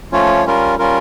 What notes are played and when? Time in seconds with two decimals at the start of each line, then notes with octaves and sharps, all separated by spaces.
0.12 F3 A3 C#4 F4 C#5
0.45 G3 C#4 F4 A#4
0.78 G3 C#4 F4 A#4